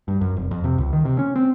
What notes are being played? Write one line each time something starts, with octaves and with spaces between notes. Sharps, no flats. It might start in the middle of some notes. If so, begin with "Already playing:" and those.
G2
F#2
F1
F2
C3
C#2
D#3
C3
C#4
C4